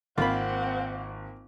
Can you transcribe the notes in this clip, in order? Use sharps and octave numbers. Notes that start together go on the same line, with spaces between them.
G#1 A#3 C4 F4 F#5 B5